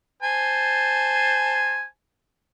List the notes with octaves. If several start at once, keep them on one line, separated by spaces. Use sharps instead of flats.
C5 G#5 A5